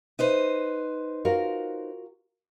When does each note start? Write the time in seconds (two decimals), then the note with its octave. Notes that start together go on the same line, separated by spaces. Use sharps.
0.19 D#4 B4 C5
1.25 F4 F#4 A#4